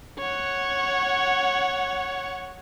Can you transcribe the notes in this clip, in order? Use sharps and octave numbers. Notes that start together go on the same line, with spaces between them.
C#5 F#5